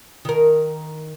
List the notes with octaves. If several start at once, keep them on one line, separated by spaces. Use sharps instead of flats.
D#3 A#4